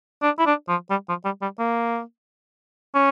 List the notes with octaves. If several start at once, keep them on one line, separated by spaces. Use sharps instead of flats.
D4
E4
D4
F3
G3
F3
G3
G3
A#3
C#4